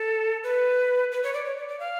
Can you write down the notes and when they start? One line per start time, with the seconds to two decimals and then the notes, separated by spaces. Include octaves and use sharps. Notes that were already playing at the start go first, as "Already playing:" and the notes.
Already playing: A4
0.44 B4
1.12 B4
1.23 C#5
1.34 D5
1.45 C#5
1.57 D5
1.68 D5
1.80 F5